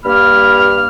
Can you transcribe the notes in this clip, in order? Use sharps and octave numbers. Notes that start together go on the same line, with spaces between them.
G2 A#3 B5 F6